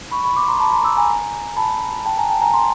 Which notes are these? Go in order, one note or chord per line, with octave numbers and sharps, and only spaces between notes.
B5 C#6
B5 C#6
C6 D6
A#5 C6
A5 B5
A#5 C6
D6 E6
G#5 A#5
A5 B5
G5 A5
G#5 A#5
G5 A5
G#5 A#5
A#5 C6